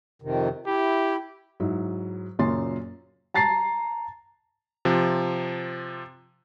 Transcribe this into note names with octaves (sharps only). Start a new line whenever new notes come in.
F2 C3 D#3
E4 G4
G#2 F#3 E4
F#1 F#2 A#2 C#5 C6 A6
A5 A#5 A6 C7
C3 F3